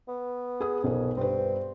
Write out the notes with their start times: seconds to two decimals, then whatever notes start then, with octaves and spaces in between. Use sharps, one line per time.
0.08 B3
0.60 G#4 D#6
0.84 B1 F2 A#4
1.17 G2 C4 B4